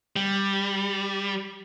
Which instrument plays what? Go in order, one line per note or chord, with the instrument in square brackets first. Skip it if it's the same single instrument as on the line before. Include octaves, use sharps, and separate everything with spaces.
[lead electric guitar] G3